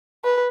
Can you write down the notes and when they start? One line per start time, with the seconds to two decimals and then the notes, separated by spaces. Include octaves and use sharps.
0.24 B4